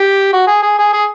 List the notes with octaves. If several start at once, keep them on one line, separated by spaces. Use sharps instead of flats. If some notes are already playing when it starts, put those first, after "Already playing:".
Already playing: G4
F#4
G#4
G#4
G#4
G#4